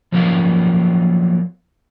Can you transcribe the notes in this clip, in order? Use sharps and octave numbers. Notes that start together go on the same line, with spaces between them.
F3 F#3 A#3 B3 F4 F5